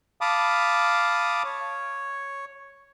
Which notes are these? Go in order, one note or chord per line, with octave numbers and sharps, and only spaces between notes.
F5 A5 B5 D6 D#6
C#5